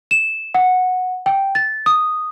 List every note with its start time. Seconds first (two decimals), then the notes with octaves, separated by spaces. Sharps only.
0.11 E7
0.54 F#5
1.26 G5
1.55 A6
1.86 D#6